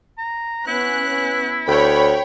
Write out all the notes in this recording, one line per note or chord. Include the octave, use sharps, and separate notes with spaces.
A#5
B3 C#4 E4 F#6
D2 C#5 G5 B5